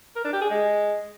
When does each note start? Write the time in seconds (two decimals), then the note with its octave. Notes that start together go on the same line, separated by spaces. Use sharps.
0.16 A#4
0.24 D4
0.33 G4
0.41 G#4
0.50 G#3